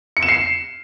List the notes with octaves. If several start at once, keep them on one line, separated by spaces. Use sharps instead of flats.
C#7
E7
C7